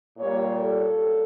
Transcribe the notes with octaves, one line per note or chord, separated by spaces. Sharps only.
A#2 G3 A#3 C#5
A4